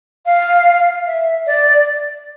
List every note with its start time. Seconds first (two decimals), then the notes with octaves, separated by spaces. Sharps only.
0.26 F5
1.07 E5
1.47 D5